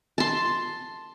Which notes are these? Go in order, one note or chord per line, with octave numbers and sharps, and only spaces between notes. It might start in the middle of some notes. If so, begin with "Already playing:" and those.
A5 C6